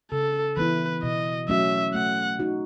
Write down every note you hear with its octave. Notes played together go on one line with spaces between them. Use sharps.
C#3 A4
E3 B3 E4 B4
B2 D#5
F#3 A3 C#4 F#4 E5
A3 F#5
D#4 F#4